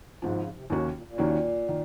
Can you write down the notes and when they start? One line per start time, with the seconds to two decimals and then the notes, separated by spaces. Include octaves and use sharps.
0.22 G#1 G#2 C#3 F3
0.38 C#3
0.54 C3
0.70 D#2 C3 D#3 A#3 C#4 F#4
0.82 C3
0.94 A#2
1.07 A#2
1.18 D#2 D#3 A#3 C#4 F#4
1.69 D#3